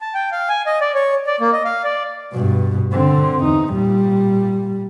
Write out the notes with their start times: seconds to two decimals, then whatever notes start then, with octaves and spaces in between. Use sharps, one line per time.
0.01 A5
0.14 G5
0.32 F5
0.49 G#5
0.66 D#5
0.81 D5
0.95 C#5
1.27 D5
1.40 A#3
1.53 D#5
1.65 F5
1.84 D5
2.32 G2 B2
2.92 D3 C4
3.44 E2 D#4
3.73 A#2 G3